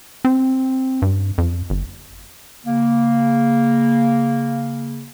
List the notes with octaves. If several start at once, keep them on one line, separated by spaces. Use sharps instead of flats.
C4
G2
F2
G1
C#3 A#3